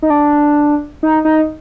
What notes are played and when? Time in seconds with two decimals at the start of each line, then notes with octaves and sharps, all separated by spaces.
0.02 D#4
0.10 D4
1.03 D#4
1.25 D#4